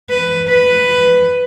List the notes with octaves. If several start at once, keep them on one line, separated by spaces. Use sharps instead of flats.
B4
B4